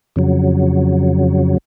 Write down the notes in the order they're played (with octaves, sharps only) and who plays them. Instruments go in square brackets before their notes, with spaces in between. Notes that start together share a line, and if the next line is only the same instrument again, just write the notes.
[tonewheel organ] F2 C#3 F#3